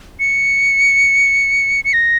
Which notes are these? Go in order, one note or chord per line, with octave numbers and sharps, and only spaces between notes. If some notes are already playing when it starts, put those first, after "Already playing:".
C#7
C#7
A#6